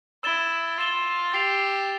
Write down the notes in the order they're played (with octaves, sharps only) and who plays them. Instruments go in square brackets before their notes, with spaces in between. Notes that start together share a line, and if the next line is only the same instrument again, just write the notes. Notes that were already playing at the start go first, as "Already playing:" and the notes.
[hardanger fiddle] E4 [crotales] E6 A6 E7 G7
[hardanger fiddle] F4 [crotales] E6 A6 E7 G7
[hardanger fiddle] G4 [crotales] A6 C7 F7